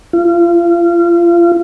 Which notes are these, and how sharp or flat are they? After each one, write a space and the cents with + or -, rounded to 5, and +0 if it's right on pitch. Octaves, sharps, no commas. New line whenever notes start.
F4 -30